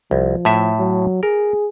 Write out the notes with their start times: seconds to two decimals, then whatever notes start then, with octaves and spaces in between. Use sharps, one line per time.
0.11 C2 F3
0.45 A2 E5
0.79 F#3
1.23 G#4 A#4